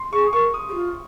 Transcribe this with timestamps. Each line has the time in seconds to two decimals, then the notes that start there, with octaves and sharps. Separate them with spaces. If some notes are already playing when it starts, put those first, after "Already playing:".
Already playing: C6
0.13 G#4 C#6
0.33 A#4 C#6
0.54 D#6
0.69 G4
0.74 F4